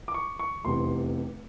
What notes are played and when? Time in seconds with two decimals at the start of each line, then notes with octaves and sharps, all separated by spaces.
0.08 D6
0.14 C#6
0.39 C#6
0.65 F1 E2 C3 C6